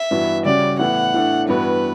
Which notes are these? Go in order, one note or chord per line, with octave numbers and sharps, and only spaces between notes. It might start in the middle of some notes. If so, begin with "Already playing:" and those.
Already playing: E5
G2 E3 B3 F#4
C#3 G3 C#4 F#4 D5
A2 E3 B3 E4 F#5
A2 E3 A3 D4
G2 E3 B3 F#4 B4